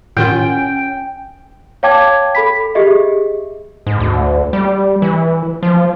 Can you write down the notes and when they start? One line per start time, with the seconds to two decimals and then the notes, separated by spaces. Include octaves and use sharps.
0.17 A2 D#3 C#4 F4 G5
1.83 C#5 F5 G5 A5 D6 G#6
2.35 A4 B5 B6
2.75 G4 G#4 D#5 E5
3.87 G#2
4.00 D2
4.53 G3
5.02 E3
5.63 F3